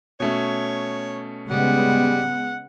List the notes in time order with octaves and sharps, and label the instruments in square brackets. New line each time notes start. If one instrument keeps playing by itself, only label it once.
[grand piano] B2 A3 C#4 [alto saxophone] C#5
[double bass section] C#3 G#3 B3 [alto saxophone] G3 [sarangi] F#5